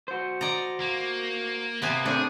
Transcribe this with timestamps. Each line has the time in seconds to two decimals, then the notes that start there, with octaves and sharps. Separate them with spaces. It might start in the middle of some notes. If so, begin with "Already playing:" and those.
0.08 F#4 C5
0.41 D5 D#5 A#5
0.81 A#3
1.82 C3 A#3 B3 G#5
2.06 A3 C4 D4 G#4 C5